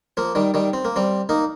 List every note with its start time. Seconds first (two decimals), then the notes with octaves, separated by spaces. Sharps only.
0.17 F3 A#3
0.35 D#3 G3
0.54 D#3 G3
0.73 C4
0.85 A#3
0.96 G3 C4
1.29 A#3 D#4